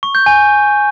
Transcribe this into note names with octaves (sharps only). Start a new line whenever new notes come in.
C#6
G6
G#5